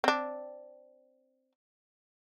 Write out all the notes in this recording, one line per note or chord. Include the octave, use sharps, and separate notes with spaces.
C4 D4